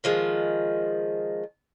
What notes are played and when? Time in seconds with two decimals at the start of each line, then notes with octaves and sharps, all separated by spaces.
0.04 D#3 F3 G#3